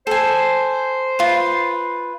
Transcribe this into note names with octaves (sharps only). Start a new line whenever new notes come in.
A4 C5 G#5
F4 B4